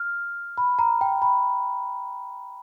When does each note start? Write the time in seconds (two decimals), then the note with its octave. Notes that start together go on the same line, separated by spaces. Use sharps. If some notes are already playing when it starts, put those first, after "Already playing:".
Already playing: F6
0.58 B5
0.79 A#5
1.01 G5
1.22 B5